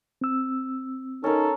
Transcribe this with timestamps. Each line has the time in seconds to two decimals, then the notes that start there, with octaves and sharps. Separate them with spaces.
0.21 C4 E6
1.24 C#4 D#4 A4 A#4